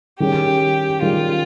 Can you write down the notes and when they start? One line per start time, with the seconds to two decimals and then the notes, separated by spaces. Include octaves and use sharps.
0.20 D#3 G3 C#4 G4 G#4
1.02 D#3 G3 C#4 F4 G#4